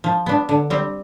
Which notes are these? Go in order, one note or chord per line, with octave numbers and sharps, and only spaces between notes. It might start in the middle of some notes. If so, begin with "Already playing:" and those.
F3
B3 D4
D3
G3 C4